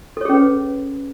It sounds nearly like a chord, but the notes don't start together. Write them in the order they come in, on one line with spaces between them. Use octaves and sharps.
A4 C#5 G#4 C#4 B4